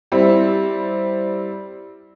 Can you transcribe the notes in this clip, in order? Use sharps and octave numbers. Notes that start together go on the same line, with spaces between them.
G3 C4 E4